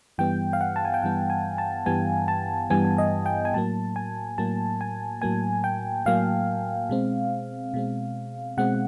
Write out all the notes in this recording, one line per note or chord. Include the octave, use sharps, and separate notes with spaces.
G2 E3 G3 B3 G5
F5
F#5
A5
G#5
G5
G2 E3 G3 B3 F#5
G#5
A5
G2 E3 G3 B3 G#5
A5
G2 E3 G3 B3 G#5
D#5
G5
G#5
A2 F#3 A#3 A5
G#5
A2 F#3 A#3 A5
G#5
A2 F#3 A#3 G#5
G5
A2 F#3 A#3 F5
B2 G#3 C4
B2 G#3 C4
B2 G#3 C4 F#5